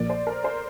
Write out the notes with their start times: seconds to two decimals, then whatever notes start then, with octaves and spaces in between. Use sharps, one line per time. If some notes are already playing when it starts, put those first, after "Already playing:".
Already playing: A#1 A#2 F3 A#3 D5
0.10 C5
0.27 A#4
0.44 C5